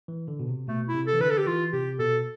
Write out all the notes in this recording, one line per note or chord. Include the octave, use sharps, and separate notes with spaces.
E3
D3
B2
C3
B2 A3
E4
C3
A4
E3
D3 B4
A4
G4
E3 F4
C3 G4
B2 A4